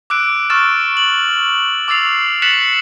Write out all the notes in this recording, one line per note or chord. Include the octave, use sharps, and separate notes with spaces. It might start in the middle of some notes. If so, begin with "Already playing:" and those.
D6 E6 F#6 D7
C#6 E6 F6 A6 E7
F#7
D6 E6 A6 C7 F7
F#6 A6 B6 C#7 E7 F#7